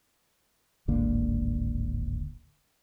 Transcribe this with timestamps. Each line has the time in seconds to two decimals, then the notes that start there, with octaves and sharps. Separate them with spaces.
0.88 D1 G#1 D3 A#3